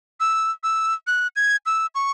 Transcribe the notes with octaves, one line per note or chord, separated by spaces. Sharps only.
E6
E6
F#6
G#6
E6
C#6